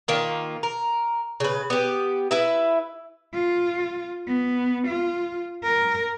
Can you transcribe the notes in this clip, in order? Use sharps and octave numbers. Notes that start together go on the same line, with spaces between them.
D#3 A#3 F4
A#4
C#3 B4
B3 G4
E4 B4 E5
F4
B3
F4
A#4